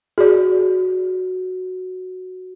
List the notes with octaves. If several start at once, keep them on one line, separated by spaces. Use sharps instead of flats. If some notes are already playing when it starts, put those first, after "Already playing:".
F#4 G#4 D5